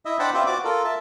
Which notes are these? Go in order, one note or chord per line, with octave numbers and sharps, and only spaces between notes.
E4 D#5 E5
D4 C5 F#5 G5 A5 B5
C4 F4 G4 B4 C5 E5
F#4 D5 D6
F4 A4 A#4
E5 A5